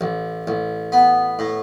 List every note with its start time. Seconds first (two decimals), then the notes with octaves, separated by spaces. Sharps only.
0.01 A1
0.47 A1
0.92 B3
1.39 A2